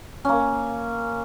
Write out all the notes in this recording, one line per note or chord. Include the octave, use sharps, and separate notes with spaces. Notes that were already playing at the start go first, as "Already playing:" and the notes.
A#3 C#4